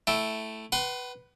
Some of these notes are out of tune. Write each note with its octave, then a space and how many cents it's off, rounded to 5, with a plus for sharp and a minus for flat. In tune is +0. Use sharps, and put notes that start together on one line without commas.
A3 +0 E4 +0 G5 +0
B4 +0 F#5 +40 C6 +0